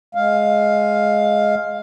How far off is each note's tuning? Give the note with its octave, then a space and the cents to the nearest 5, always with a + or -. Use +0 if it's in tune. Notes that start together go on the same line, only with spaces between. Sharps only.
G#3 +15 F5 +5